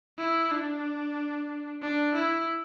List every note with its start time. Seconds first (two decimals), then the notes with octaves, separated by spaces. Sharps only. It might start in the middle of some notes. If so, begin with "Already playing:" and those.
0.19 E4
0.52 D4
1.82 D4
2.15 E4